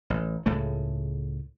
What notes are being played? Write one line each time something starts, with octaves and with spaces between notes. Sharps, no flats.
A1
C#2 A2 G#3 A3